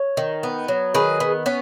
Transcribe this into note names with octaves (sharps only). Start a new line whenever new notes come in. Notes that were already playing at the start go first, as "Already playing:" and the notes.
Already playing: C#5
D#3
B3
F#3
D#3 G#4 B4
B3
B3 C#4